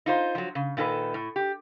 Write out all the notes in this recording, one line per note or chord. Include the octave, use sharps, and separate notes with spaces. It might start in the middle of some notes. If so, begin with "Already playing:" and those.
D#4 F4 C5
F3 F#3
C#3
A#2 D#3 A4 B4
A2
G4